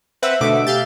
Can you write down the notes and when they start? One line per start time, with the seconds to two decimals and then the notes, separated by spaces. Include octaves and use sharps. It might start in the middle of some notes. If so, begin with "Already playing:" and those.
0.22 C4 B4 E5 F#5
0.41 B2 D3 A3 D6
0.67 G4 F5 G6 A6